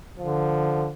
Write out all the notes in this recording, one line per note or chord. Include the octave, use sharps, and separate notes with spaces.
D3 F3